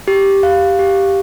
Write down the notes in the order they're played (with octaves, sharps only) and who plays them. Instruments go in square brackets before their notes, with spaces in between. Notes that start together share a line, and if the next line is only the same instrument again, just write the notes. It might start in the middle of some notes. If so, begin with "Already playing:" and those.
[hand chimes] G4
F5
G4